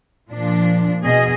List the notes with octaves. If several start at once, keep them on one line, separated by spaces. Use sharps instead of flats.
A#2 F3 D4
B2 G#4 D#5